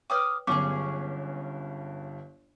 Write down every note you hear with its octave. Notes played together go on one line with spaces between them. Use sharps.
B4 C#5 G5 D6 D#6 F6
G1 G2 D3 F#3 B3 C#4 G#4 D6